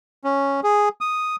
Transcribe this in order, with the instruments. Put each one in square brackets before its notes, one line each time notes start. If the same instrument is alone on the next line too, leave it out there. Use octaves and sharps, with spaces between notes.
[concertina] C#4
G#4
D#6